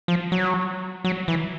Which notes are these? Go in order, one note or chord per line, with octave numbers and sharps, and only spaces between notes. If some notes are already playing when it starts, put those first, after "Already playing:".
F3
F#3
F#3
E3